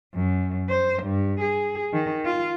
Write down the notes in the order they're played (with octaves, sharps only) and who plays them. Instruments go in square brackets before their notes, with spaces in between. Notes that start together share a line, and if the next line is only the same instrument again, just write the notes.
[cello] F#2
C5
G2
G#4
D#3
F4